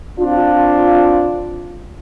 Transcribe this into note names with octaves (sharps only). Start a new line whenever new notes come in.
C4 D4 F4